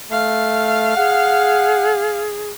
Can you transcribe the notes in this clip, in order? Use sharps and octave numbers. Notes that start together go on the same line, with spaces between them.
A3 F5
G#4 F#5